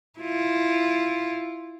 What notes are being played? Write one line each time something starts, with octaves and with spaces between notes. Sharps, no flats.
E4 F4